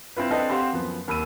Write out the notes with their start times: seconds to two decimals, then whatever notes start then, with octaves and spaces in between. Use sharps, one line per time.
0.17 C4 E4 F4 B4
0.31 C4 D4 A4 B4 D#5 G5
0.49 C4 G4 C5 F5 F#5 C6
0.72 F#2 F3 B3
1.08 D#2 B5 E6 D#7